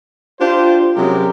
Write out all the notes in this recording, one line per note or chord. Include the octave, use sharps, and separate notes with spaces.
D4 F4 G4 C5
C3 F#3 G#3 C#4 G4 A#4